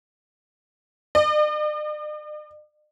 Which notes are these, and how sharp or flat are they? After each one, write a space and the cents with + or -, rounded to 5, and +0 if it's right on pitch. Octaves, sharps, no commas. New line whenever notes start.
D5 +45